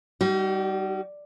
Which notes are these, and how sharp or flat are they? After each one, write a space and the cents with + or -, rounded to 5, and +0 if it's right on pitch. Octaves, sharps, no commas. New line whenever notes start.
G3 +0 D#4 +0 F#4 +45